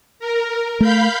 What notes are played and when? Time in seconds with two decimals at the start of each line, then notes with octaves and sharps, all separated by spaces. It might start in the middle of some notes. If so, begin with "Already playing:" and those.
0.19 A#4
0.81 A3 F5 B5 G6